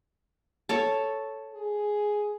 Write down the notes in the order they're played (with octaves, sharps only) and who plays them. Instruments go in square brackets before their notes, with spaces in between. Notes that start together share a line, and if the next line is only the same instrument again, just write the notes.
[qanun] A4 C#5 A5
[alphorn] G#4